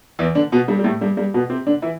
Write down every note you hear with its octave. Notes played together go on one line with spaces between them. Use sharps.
E2 E3
D3 D4
B2 B3
G2 G3
G3
A2 A3
G2 G3
G2 G3
B2 B3
C3 C4
D3 D4
E3 E4